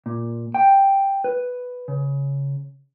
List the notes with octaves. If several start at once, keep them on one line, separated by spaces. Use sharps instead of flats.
A#2
G5
B4
C#3